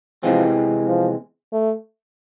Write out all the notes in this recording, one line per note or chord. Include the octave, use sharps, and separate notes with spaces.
E2 C3 E3 F3 G#3 C4
F3
A3